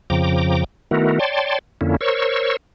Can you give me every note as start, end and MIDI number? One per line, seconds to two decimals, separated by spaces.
0.10 0.64 41
0.10 0.64 49
0.10 0.64 53
0.10 0.64 79
0.10 0.64 82
0.10 0.64 86
0.91 1.19 51
0.91 1.19 57
0.91 1.19 59
0.91 1.19 64
0.91 1.19 66
0.91 1.19 70
1.19 1.59 73
1.19 1.59 74
1.19 1.59 79
1.19 1.59 81
1.19 1.59 84
1.81 1.96 41
1.81 1.96 50
1.81 1.96 58
1.81 1.96 61
1.81 1.96 64
2.01 2.57 70
2.01 2.57 72
2.01 2.57 73
2.01 2.57 85
2.01 2.57 88